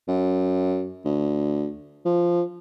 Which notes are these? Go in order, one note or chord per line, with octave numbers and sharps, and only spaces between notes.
F#2
D2
F3